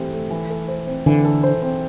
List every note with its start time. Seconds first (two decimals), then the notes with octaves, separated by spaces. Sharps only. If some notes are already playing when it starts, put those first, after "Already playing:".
Already playing: E3 A3 C4 G4
0.13 A3
0.30 E3
0.50 A4
0.68 C5
0.87 C4
1.06 D3 E3
1.25 A4
1.43 C5
1.62 C4